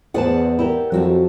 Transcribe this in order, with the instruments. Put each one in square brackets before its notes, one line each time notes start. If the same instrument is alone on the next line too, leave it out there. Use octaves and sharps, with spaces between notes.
[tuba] E2 [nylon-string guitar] G#4 B4 A5 [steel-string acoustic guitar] C5 D5 F#5
[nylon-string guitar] E4 G4 A#4
[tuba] F2 [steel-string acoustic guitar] F#3 F#4 A5